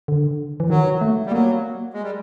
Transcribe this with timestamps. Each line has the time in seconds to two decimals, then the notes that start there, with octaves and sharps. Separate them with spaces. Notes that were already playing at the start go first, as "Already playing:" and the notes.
0.08 D3
0.60 E3
0.70 D#3 F#3
1.01 A3
1.27 G3
1.31 F#3 A#3
1.94 G#3
2.02 G3